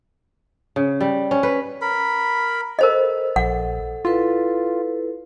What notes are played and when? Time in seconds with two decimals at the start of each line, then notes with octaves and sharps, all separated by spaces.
0.76 C#3
1.01 G3
1.31 C#4
1.43 B4
1.82 A#4 B5
2.79 A4 A#4 C5 D#5
3.36 A#1 A4 F#5
4.05 E4 F4 A4 B4